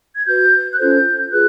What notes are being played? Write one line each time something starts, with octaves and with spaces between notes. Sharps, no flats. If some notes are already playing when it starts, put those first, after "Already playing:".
G#6
F#4 B4 G6
F#6
C#4 F4 A4 C5 G6
F4 G#4 B4 F#6